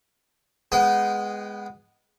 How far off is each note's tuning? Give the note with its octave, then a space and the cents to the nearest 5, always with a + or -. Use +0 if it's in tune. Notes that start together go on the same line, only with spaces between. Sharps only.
G#3 -5 B3 +0 G5 -40